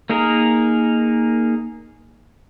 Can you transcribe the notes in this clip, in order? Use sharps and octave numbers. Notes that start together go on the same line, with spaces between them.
A#3 D#4 G#4 A#4